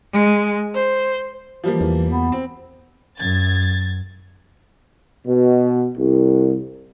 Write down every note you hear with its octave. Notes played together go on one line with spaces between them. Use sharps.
G#3
C5
E3 F3 G3 A#3
E2
B3
C4
F#2 G#6 A6
B2
C2